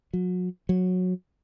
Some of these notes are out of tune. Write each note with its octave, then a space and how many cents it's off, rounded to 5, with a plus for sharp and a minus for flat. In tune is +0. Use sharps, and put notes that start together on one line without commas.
F#3 -35
F#3 -15